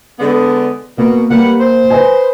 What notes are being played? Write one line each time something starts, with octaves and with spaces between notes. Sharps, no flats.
D3 G#3 B3
B2 A#3
G3 A#3 B4 F#5
C5
B4 D#5 G#5